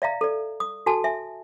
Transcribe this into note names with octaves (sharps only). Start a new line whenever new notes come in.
D5 E5 F5 A#5
A4 D5
D#6
F#4 A4 G#5 A5
E5 G#5